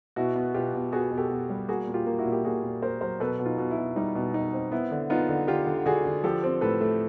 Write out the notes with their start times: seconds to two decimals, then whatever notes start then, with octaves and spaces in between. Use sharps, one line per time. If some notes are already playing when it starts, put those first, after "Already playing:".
0.16 B2 E4 F#4
0.36 B3
0.54 B2 F4 G4
0.74 B2
0.92 B3 F#4 G#4
1.11 B2
1.17 G4 A4
1.30 B2
1.50 G3
1.68 A#3 F#4 G#4
1.88 A#2
1.94 F4 G4
2.07 A#3
2.19 E4 F#4
2.25 A#2
2.32 G4
2.44 A#2 F#4 G#4
2.63 A#2
2.82 A#3 A#4 C5
3.01 F#3 A#4 C5
3.20 B2 A4 B4
3.39 B2
3.45 D#4 F4
3.58 B2
3.71 E4
3.77 B2
3.96 G3 D#4
4.15 B2
4.34 B2 D#4
4.53 C4
4.72 B3 E4
4.91 D3
5.10 B3 D#4 F4
5.29 D3
5.48 D3 F4 G4
5.67 D3
5.86 D3 F#4 G#4
6.05 D3
6.24 F3 G4 A4
6.43 C4
6.61 A2 A4 B4
6.81 A3